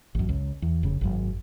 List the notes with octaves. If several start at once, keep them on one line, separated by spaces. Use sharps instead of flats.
A1 F#2
C#2
E2
F1 C#3
G#1 F#2